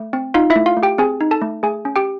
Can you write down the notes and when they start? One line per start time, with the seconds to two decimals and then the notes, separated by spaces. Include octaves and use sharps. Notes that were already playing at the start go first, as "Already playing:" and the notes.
Already playing: A3
0.13 C4
0.34 D#4 F4 F5
0.50 E4 E5
0.56 A3
0.66 F4 F5
0.77 A3
0.83 G4 G5
0.98 C4 G#4 G#5
1.21 D#4
1.31 A4 A5
1.42 A3
1.63 A3 G#4 G#5
1.85 C#4
1.96 G4 G5